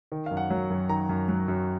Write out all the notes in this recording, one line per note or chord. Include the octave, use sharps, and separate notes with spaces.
D#3
F#2 F5
F#5
F#3
F#2
D#3 A#5
F#2
F#3
F#2